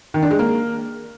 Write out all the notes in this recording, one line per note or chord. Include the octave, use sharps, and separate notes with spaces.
D#3
D4
G#3
A#3